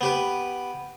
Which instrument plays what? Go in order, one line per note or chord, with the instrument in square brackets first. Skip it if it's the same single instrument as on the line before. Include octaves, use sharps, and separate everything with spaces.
[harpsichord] B3 G4 B4